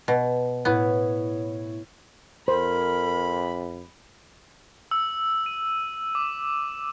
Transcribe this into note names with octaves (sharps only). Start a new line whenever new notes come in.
B2
A2 B3 E4 C#5
F2 A#4 C5 B5
E6
D#7
D6